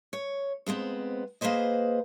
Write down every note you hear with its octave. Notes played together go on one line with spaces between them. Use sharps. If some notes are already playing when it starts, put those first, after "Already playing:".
C#5
F2 G#3 B3 C4
A#3 G#4 B4 C5 D#5